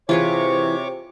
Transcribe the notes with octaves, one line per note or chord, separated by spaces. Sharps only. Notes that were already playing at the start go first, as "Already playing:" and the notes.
C3 E3 F4 G#4 B4 C#5 C#6 D6